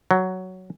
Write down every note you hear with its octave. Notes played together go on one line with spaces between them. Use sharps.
F#3